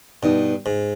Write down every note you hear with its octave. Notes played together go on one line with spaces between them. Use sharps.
G2 B2 B3 D#4 B4 D#5
G#2